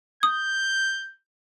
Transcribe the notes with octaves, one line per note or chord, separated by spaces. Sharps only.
D#6 G6